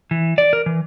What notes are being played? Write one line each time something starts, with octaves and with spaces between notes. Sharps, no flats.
E3
D5
A#4
E3